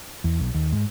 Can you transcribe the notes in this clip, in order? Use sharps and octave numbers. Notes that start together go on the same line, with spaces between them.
E2
B1
D#2
G#2